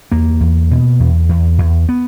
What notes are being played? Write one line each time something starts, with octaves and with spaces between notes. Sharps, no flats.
E2 A#3
E2
B2
E2
E2
E2
B3